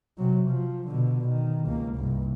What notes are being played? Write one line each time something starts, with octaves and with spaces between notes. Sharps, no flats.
C3 F#3
F3
B2 D3
D#3
C#2 A#3
C2 G2